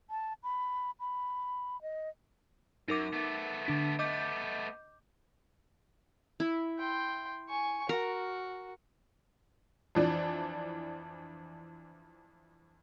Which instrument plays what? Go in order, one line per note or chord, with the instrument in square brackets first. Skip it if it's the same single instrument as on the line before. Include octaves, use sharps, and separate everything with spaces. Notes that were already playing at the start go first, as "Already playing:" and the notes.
[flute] A5
B5
B5
D#5
[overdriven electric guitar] F#2 [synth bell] D#4 A#4 D6
[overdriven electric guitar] A3 B3
[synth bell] D3 D4 B6
[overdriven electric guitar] A3 B3 [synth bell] D#5 D6 G6
[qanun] E4
[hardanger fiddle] G5 C6
G#5 C#6
[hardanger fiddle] F#4 [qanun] A#4
[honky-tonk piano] F2 E3 D4